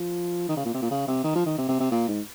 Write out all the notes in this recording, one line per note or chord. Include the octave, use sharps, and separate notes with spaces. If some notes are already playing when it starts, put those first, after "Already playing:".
Already playing: F3
D#3
C#3
A#2
C3
A#2
C#3
C3
D#3
F3
D#3
C3
C3
C3
A#2
G#2